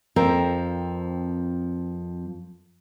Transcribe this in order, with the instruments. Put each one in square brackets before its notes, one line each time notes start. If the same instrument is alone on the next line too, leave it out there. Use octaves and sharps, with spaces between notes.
[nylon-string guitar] F2 F3 C4 A#4